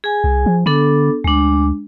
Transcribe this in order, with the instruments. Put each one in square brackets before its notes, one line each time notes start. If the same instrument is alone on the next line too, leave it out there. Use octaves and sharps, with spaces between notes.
[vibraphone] G#4 G#5
[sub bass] C2
F3
[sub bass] D3 [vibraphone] B3 D4 A4
[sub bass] D2 [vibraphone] G#3 D4